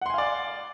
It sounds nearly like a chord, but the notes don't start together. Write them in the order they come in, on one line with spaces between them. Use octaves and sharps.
F#5 C6 G#5 F5 D5